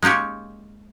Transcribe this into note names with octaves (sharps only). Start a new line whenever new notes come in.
G#3 A#3 D#4 G4 C#5